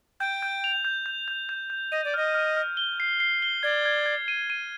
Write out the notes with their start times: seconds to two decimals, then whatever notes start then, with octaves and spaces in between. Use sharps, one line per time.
0.20 G5 G6
0.43 G6
0.64 F7
0.85 G6
1.06 G6
1.28 G6
1.49 G6
1.70 G6
1.92 D#5 D#7
2.05 D5
2.14 D#5 F6
2.34 F6
2.57 F6
2.77 G7
3.00 C7
3.20 C7
3.42 G7
3.63 D5 G#6
3.86 G#6
4.06 G#6
4.28 D#7
4.50 D#7